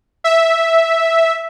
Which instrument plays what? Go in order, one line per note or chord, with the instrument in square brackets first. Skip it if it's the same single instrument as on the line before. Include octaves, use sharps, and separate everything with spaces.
[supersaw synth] E5